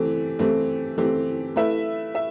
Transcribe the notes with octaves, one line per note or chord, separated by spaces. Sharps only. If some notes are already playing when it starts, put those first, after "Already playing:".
Already playing: E3 A3 C4 G4
E3 A3 C4 G4
E3 A3 C4 G4
A3 E4 B4 E5
E5